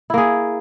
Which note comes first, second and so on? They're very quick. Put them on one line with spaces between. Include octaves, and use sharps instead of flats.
E4 A#3 G#4